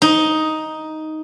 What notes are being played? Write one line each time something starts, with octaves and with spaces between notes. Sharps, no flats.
D#4